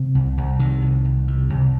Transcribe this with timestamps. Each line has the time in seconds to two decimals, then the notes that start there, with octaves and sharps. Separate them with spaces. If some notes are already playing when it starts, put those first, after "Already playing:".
Already playing: C3
0.15 C2
0.38 C2
0.59 C3 D#3
0.82 C2
1.05 C2
1.28 C3
1.50 C2